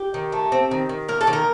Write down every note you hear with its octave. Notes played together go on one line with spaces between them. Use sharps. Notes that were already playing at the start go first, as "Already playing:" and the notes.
Already playing: G4
D#3
A3
C4
D#3
D#3
A#3 A#4
A4
D#3
A#4